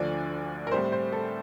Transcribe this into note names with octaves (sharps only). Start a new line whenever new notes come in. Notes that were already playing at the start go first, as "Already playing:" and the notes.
Already playing: D2 D3 F3 D5
A#4
A2 G3 C4 C5
C5
A4